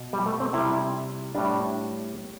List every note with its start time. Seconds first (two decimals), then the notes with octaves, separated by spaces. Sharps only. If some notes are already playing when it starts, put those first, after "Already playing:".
Already playing: B2
0.13 G3
0.26 A3
0.40 C4
0.53 C3 G3 E4
1.35 A2 G3 D4